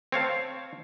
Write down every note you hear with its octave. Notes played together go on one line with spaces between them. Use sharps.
C4 C#5 F5 A5